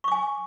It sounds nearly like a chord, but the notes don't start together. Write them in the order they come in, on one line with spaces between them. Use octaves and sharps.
C#6 D6 G#5